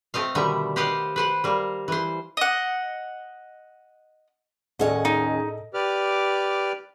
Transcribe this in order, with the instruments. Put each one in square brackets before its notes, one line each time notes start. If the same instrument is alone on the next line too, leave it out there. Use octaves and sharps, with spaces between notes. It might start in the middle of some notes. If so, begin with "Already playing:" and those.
[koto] A3 C4 D#5 F5
B2 D3 D#3 G3 E5
G4 B4 C5 D#5 F5 F#5
B4 C5 F#5
G3 A#3
E3 C5
[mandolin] D#5 F#5
[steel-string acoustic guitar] D#2 C#4 F#5 [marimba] A2 D5 [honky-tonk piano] G#4 A4 D#5
[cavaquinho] D#4
[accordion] G4 B4 D5 D6 F6